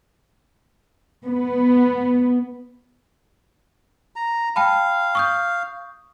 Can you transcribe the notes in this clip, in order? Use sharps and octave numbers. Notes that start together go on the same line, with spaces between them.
B3
A#5
F5 G5 A5 B5
C#6 D#6 G6